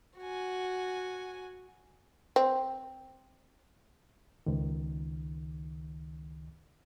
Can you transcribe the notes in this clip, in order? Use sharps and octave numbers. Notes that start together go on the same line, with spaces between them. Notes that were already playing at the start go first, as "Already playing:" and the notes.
F#4 G#5
C4
C#2 D#3